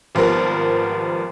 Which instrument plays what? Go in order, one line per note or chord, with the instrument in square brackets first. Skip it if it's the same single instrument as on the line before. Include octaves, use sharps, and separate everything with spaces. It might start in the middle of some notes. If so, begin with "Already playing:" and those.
[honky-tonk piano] G#1 F3 G3 B3 A#4